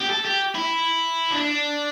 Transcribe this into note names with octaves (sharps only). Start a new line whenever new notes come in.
G4
A4
G4
E4
D4